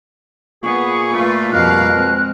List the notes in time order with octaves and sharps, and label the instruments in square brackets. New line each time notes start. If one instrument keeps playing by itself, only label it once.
[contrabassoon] A#2 [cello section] B3 [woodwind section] G#4 [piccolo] C#6
[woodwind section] A3 [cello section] F4 B4
[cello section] F2 G3 F5 [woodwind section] B2 A#4 F6 [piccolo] F#6
[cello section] G#3 C4